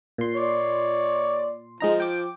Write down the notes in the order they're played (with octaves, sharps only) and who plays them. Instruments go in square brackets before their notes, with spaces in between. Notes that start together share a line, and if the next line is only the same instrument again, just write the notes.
[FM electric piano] A#2 C6
[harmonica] C#5 D5
[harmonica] F3 [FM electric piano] G#3 D#4 A#5
[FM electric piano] G5 D6